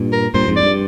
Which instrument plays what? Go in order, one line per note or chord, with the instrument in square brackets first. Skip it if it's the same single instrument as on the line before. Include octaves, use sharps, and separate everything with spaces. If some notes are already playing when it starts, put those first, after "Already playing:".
Already playing: [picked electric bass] G2 A#2
[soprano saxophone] A#4
[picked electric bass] G2 A#2 [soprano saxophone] C5
[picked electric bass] F2 G#2
[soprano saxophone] D5
[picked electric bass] G2